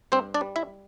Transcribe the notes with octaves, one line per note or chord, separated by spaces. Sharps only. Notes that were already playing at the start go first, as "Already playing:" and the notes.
G2 C4 C5
D4 D5
G3
E4 E5